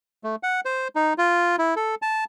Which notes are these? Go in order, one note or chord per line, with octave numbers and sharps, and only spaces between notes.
A3
F#5
C5
D#4
F4
E4
A4
A5